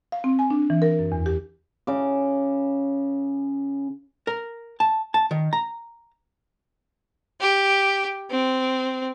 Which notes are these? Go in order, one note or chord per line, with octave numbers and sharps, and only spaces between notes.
F5
C4
G#5
D4
E3
A#4
F#2
E2
G4
C#3 D6
A#4
A5
A5
D#3
A#5
G4
C4